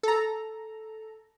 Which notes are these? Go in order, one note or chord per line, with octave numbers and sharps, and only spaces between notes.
A4 A#5